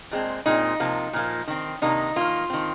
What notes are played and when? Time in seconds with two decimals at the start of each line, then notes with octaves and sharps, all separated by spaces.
0.11 A#2 G#3 C4
0.46 A#2 G#3 C4 D#4
0.80 C3 F3 A#3
1.13 A#2 F3 A#3
1.47 D#3 C4
1.82 C3 D#3 A#3 D#4
2.16 D#3 A#3 F4
2.50 D#3 C4